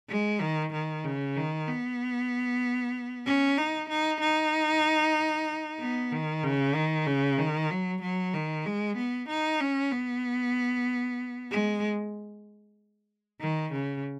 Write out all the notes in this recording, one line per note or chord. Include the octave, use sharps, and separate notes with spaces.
G#3
D#3
D#3
C#3
D#3
B3
C#4
D#4
D#4
D#4
B3
D#3
C#3
D#3
C#3
D#3
F#3
F#3
D#3
G#3
B3
D#4
C#4
B3
G#3
D#3
C#3